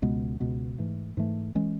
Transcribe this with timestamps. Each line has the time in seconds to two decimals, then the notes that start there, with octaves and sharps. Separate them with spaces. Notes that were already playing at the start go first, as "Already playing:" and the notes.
0.02 C#2 B2 G#3 B3
0.40 C#2 B2 G#3 B3
0.78 G#2 E3 A3
1.17 G#2 E3 A3
1.55 E3 G#3 C#4